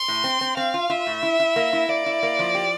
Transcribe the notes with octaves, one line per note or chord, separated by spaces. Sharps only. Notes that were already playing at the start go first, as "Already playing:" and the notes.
Already playing: C6
A2
C4
C4
C4 F5
F4
F4 E5
A2
E4
E4
A#3
E4
A#3 D5
E4
A#3
F3
G4